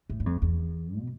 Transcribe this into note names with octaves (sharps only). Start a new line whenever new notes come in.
A2
G2
F2
E2
B2